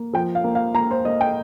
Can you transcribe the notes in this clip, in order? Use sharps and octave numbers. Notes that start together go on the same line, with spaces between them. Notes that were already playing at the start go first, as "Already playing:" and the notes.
Already playing: A#3
F3 G5
F5
A#3
F5
A#3 A#5
C5
A#3 D#5
G5